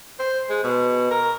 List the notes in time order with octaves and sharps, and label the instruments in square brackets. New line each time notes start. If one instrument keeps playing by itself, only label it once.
[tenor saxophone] C5
G#3
B2
A#4